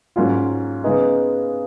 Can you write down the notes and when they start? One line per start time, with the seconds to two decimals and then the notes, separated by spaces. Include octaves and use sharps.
0.16 G#2 F#3 A#3 C#4 F4
0.84 C#3 G#3 B3 D#4 G#4